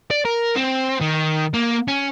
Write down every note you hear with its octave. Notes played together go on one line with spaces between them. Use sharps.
D5
A#4
C4
D#3
A#3
C#4